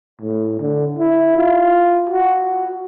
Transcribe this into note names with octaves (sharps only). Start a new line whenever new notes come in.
A2
D3
E4
F4
F#4